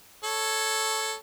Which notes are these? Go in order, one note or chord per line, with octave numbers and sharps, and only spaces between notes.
A4 C#5